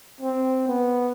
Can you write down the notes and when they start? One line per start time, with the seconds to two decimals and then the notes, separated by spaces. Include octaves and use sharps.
0.21 C4
0.68 B3